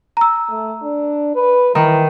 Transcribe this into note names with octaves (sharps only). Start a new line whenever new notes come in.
A#5 E6
A3
D4
B4
D#3 E3 A#5